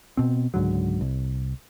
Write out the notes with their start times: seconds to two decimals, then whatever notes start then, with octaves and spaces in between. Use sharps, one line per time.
0.17 B2 C4
0.54 C#2 G#2 D3 F#3
1.01 C2